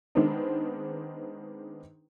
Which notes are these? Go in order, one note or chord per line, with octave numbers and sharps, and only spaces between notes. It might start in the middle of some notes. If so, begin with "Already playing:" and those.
D#3 G#3 B3 C4 D4 D#4